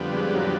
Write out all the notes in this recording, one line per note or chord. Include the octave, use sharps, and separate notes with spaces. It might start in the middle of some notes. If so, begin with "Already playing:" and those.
Already playing: F2 D3 G3 B3
G#3
F#3